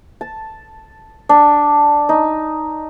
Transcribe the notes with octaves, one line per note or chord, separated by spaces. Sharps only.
A5
D4
D#4